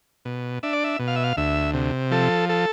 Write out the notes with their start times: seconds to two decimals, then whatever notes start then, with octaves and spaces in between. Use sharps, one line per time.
0.25 B2
0.63 D4 E5
0.73 D5
0.84 E5
0.99 B2
1.08 F5
1.16 E5
1.24 F5
1.37 D2 E5
1.74 C3
2.11 F3 A4
2.49 A4